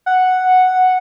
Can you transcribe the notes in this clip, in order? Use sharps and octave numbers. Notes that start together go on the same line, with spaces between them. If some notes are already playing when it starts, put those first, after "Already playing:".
F#5